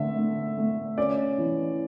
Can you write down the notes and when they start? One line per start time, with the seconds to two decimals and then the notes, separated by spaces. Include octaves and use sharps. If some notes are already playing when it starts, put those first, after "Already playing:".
Already playing: D3 A3 E5
0.16 A3
0.57 A3
0.97 C#4 D5
1.38 E3